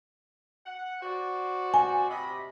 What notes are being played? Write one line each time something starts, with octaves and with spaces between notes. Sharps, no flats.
F#5
F#4 C5 D5
G#5
C3 D#5 B5